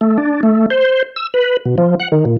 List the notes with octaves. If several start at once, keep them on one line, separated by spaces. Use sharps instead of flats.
A3
D4
A3
C5
E6
B4
B2
F3
F#5
D#3
A#2